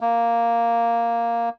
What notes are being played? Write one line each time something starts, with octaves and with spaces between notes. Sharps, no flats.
A#3